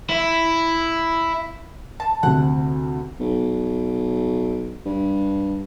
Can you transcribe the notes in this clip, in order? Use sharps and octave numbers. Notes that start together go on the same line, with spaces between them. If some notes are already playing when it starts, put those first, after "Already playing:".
E4
A5
D2 C3 F#5
B1
G2